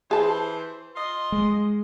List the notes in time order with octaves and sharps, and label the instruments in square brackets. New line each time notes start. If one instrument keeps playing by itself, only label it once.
[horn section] E3 C5 [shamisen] G#4 A5
[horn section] F4 D#5 C6
[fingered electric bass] G#3